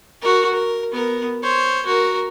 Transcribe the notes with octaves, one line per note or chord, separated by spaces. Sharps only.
F#4 A#4
A#4
B3 A#4
C5 C#5
F#4 A#4